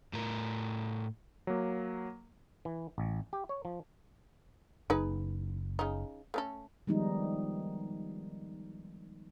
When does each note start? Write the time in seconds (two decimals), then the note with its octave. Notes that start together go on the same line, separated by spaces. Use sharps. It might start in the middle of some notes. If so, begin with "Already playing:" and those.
0.13 A2 A#4
1.47 F#3 A#3
2.65 E3
2.98 A1
3.33 G4
3.49 C#5
3.65 F3
4.90 F#1 D#4 G#4 B4
5.79 C#3 D#4
6.34 A3 C#4 A4
6.87 D#3 F3 G3 G#3 B3 D#4